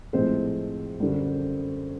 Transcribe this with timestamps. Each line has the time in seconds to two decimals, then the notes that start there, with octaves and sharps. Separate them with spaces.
0.13 A2 F3 G#3 C4 C5
1.00 F#2 D3 G3